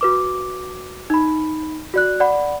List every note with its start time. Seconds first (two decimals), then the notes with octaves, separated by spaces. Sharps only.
0.01 F#4 B4 D6
1.10 D#4 B5
1.94 F#4 D5 F#6
2.20 D5 F#5 B5